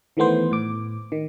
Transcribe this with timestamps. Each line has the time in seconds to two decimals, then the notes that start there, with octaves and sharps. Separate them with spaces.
0.17 D#3 E3 A3 B3 C5
0.51 A2 D6
1.12 D#3